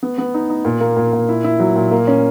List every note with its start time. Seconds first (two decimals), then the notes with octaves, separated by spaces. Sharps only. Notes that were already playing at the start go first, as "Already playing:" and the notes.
0.03 B3
0.18 B3
0.34 D#4
0.50 D#4
0.65 A#2
0.81 A#3
0.97 A#2
1.13 A#2
1.29 E4
1.44 E4
1.60 F#3
1.76 A#2
1.91 A#3
2.07 C#4